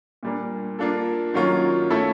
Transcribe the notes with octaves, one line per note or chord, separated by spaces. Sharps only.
A#2 G3 A#3 D4
A#3 D4 F4 A4
D#3 F#3 A#3 C#4 F4
A3 C#4 E4 A4